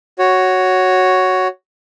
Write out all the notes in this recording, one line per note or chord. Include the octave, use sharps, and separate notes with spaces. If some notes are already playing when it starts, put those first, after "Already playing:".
F#4 C#5